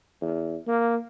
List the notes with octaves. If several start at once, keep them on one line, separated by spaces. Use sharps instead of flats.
E2
A#3